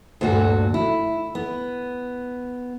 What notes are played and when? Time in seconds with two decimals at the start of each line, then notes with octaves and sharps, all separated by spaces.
0.21 D2 G2 A#2 F#4 A4
0.74 E4
1.35 B3